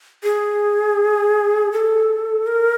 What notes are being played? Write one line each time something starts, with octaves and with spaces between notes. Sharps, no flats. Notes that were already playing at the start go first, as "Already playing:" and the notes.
G#4
A4
A#4